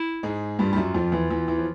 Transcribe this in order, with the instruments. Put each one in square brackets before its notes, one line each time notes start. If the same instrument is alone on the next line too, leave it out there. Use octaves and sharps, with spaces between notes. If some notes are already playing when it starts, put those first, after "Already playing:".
Already playing: [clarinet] E4
[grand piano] G#2 G#3
[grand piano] G2 G3 [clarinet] F4
[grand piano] G3
F#2 F#3
F2 F3
E2 E3
E2 E3
E2 E3
F3